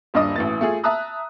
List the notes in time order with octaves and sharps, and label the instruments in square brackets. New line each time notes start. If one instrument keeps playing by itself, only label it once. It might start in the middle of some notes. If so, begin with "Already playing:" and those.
[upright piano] D#1 G2 D4 D#5 D#6
A1 E3 A6
A3 F4 G#4
E5 A5 A#5 D#6 F#6